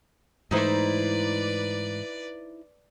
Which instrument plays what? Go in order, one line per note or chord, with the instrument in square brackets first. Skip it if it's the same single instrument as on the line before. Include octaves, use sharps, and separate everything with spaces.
[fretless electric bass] G#2 E3 A3 [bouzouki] D#4 E4 C5 [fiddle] B4 D5